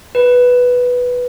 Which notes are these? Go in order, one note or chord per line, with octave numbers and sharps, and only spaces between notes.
B4